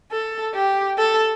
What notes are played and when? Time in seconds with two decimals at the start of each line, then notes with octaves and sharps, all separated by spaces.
0.11 A4
0.55 G4
0.98 A4